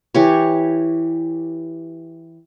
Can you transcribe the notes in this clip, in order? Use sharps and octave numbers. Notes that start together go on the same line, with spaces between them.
E3 G4 C#5